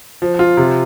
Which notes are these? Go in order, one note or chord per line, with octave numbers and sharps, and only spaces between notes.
F3
F4
C3